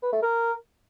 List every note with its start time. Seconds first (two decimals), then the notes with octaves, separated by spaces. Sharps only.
0.03 B4
0.13 A3
0.23 A#4